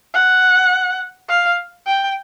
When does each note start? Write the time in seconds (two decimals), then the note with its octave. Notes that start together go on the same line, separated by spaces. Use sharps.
0.14 F#5
1.29 F5
1.87 G5